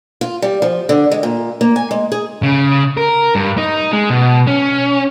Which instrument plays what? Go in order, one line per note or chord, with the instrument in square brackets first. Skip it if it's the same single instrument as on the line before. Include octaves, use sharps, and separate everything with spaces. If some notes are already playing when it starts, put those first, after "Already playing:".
[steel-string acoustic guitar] F4
G3
F3
D3
G#3
A#2
A#3
G#5
G#3
G#4
[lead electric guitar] C#3
A#4
G2
D#4
G#3
B2
C#4